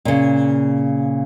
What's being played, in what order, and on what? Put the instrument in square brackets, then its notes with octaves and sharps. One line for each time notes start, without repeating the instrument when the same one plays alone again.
[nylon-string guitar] A#2 C#3